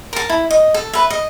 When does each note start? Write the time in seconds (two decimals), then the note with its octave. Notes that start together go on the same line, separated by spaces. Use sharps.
0.13 A#4 A5
0.30 E4
0.51 D#5
0.74 A4
0.93 B4 E5
1.10 D#5